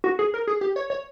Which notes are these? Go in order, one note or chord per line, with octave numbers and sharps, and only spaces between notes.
F#4
G#4
A#4
G#4
G4
C#5
C#5